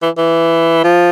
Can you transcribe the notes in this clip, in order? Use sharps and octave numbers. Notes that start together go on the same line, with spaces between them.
E3
E3
F3